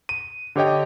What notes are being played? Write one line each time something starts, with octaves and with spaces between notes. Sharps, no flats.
D#7
D3 G4 C#5 D#5 G5